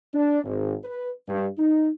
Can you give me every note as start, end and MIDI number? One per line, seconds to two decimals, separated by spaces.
0.13 0.41 62
0.44 0.73 32
0.83 1.11 71
1.28 1.46 43
1.58 1.89 63